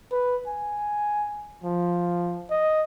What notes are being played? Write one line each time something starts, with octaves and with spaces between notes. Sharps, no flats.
B4
G#5
F3
D#5